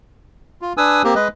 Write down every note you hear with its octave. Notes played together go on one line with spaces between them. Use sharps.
F4
D4 B4 G#5 D#6 E6
A#3 C4 G4
G#3 B4 D#5